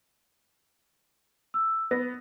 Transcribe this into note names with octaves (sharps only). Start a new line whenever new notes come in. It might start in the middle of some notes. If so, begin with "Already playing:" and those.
E6
B3 A#6